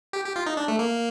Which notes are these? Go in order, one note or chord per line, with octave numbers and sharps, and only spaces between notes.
G4
G4
F4
D#4
D4
A3
A#3